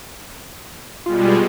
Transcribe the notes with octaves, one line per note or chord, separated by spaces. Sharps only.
B2 G3 G#3 F4